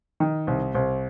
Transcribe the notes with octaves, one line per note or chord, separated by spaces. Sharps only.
D#3
C2
C2